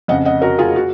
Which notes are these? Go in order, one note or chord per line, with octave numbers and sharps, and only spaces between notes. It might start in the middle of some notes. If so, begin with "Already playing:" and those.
F2 C#3 D#5 F#5
D#5 F#5
F#4 A#4
F4 G#4
F#4